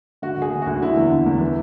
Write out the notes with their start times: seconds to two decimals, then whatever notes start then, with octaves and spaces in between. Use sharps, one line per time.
0.22 D3 F#4
0.37 D2 G#4
0.52 D3
0.62 D2 F#4
0.82 D3 E4
0.97 E2
1.11 D3
1.26 E2
1.41 E3